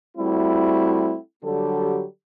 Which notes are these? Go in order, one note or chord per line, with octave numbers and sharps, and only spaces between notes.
G3 A3 C4 E4 F#4
D3 F#3 G3 G4 A4